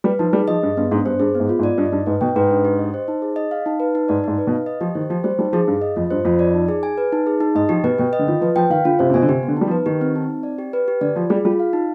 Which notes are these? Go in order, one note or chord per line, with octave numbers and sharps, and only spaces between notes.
G3 B4
F3 D#4
G3 G#4
F3 D#5
G2 G#4
G2 B3
G#2 D4
G2 C5
G2 G#4
B3
G#2
F4
G#2
D5
G2 D#5
G2 D#4
G#2 B4
B2 G5
G#2 B4
D4
G4
D#5
C5
D#4
G#4
D#5
F5
D#4
B4
D#4
G#2 D5
G#2 D#4
B4
B2
F5
D#5
F3 G4
D#3 C5
F3 G4
G3 C5
G3 D#4
F3 G#4
G2 F5
D#5
F2 F4
G2 C5
F2 F4
D5
D#4
G#4
G#5
B4
D#4
G#4
D#4
G#2 D#5
F3 G4
B2 B4
B2 G5
D#5
D3
D#3 F4
F3 B4
F3 G5
D#3 F5
D3 F4
C3 C5
C3
B2 G#5
D3
C3 G4
B3
D3
G3 D#4
F3
B4
D#3 G4
C4
D#4
C4
D5
G4
B4
G4
D3 D5
F3 F4
G3 G#4
G3 F4
F5
D#4